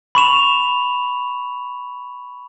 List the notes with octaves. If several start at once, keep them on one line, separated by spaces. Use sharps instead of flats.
B5 C#6 E7 F7